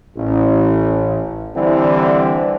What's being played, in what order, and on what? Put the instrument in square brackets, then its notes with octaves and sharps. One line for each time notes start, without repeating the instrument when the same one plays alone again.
[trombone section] A1
D3 E3 G3 C4 D4 E4